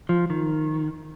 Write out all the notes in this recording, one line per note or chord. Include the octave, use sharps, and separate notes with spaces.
F3
D#3